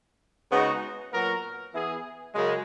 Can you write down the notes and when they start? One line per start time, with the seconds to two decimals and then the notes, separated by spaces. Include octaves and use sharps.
0.51 C#3 G#3 B3 D#4 F#4
1.11 A#2 F#3 B3 F#4 A#4
1.73 E3 B3 E4 G#4
2.33 F#2 C#3 G#3